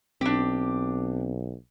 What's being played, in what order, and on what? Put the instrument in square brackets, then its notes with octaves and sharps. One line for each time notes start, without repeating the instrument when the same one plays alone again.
[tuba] B1 [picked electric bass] C4 [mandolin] D4 G4